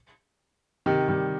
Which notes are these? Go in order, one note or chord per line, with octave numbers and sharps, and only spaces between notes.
C3 D#3
D#3 G3